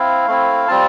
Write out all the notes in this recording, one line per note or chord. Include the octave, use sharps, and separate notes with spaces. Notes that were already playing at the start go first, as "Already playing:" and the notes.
Already playing: C4 E4 F5
A3 C4 E4
G3 C4 F4 A5